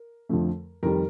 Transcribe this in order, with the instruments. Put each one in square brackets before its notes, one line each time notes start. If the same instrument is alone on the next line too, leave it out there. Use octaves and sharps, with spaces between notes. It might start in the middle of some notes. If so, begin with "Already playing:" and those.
Already playing: [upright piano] A#4
F2 D3 F3 A3
F2 D#3 G3 A#4